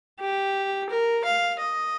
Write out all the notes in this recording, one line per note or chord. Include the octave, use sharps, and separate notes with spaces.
G4
A#4
F5
D#5